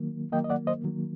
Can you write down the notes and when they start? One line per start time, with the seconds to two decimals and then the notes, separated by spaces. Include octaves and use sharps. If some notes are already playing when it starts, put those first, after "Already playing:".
Already playing: D#3 F#3 A#3
0.32 D#3 F#3 A#3 D#5 G5
0.44 D#5
0.50 D5 F#5
0.67 C5 D#5
0.84 D#3 F#3 A#3